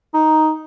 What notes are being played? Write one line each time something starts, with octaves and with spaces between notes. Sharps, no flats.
D#4